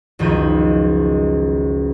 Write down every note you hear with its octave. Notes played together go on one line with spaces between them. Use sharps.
F#1 C#2 D#3 F3 G6 D#7